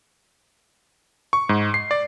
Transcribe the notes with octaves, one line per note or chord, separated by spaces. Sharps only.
C#6
G#2
C7
D5